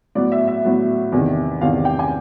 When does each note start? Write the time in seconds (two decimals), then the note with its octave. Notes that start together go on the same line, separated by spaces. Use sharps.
0.15 A2 F#3 B3 D5
0.32 E5
0.48 E5
0.64 A2 F#3 B3
1.12 E2 C3 D#3
1.61 E2 C3 D#3 F5
1.85 G5
1.99 G#5